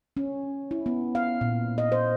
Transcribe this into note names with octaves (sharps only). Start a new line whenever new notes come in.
C#4
E4
B3
F5
A#2
D#5
C5